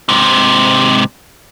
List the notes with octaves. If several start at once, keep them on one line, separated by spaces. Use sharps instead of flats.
G#2 C3